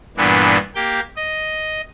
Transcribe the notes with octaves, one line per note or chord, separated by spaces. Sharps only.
G2 A#2 E3 B3 D4
A#3 G4 G5
D#5